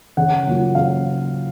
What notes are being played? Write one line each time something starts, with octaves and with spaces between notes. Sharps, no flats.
C#3 F#5
F#3 A#3 F4
C#3 F5